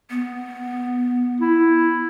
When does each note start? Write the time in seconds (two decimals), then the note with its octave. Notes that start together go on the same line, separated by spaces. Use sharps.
0.10 B3
1.40 E4